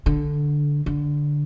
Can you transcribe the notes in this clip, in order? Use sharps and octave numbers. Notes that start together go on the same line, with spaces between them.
D3
D3